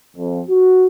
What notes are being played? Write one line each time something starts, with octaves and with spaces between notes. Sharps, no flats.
F2
F#4